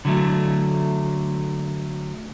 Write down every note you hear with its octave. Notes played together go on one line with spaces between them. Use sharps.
D3 F#3 A3